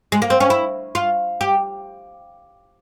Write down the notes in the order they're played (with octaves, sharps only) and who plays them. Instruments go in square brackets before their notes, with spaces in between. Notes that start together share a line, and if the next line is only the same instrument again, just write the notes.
[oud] G#3
A#3
C4
C#4
E4
F4
G4